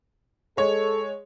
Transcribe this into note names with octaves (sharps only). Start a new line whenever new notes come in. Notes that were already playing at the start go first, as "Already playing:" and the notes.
G#3 A4 C#5